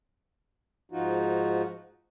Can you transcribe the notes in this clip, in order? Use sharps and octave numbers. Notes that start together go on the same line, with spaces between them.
G#2 F3 D#4 F4 F#4